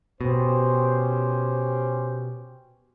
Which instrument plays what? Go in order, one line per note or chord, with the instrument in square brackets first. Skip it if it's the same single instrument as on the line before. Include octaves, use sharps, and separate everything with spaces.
[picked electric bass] B2 [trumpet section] C#4 G4 C5